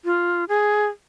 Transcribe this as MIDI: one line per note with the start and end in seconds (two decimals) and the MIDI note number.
0.05 0.44 65
0.48 0.86 68